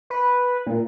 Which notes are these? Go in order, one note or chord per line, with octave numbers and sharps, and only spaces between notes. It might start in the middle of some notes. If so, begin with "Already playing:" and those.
B4
A#2